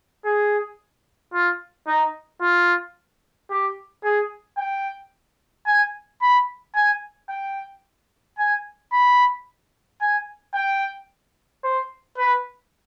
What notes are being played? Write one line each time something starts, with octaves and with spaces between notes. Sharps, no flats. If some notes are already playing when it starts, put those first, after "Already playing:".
G#4
F4
D#4
F4
G4
G#4
G5
G#5
B5
G#5
G5
G#5
B5
G#5
G5
C5
B4